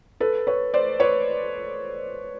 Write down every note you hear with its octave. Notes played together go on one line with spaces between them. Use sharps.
A4 B4
B4 C#5
C5 D5
B4 C#5